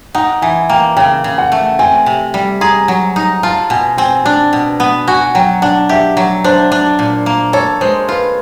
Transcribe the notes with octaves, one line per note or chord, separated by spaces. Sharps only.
D#4 F#5
E3 G#5
A#3 G5
C#3 G5
C#3
F#5
A3
C4 G#5
C3
G3
G#4 A#5
F#3
D#4
F4 A5
B2 G#5
C4 G#5
D4 A5
B2
B3
F#4 G#5
F#3 G5
D4 F#5
G4 E5
F#3
D4 C5
D4
A#2
A#3
A4 C#5
G#3 C5
F4 B4